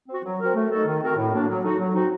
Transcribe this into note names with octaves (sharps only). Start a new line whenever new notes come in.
C4 F#4
F#3
C4 F#4 A#4
A3
D#4 F#4 A4
D#3
A3 C4 F#4 A#4
A2
F#3 A#3 D4
F#3
A3 D#4 F#4
F#3
C4 D#4 F#4